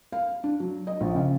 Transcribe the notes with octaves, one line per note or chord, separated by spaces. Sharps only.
F5
D4
F#3
D#5
A#1
C#3